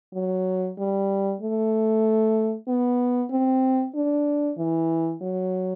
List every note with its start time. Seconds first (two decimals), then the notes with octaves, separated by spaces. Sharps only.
0.14 F#3
0.78 G3
1.41 A3
2.68 B3
3.31 C4
3.95 D4
4.57 E3
5.21 F#3